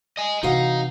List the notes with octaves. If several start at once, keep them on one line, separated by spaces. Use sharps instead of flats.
D#5 G#5
C3 E3 D#4 F#4 F5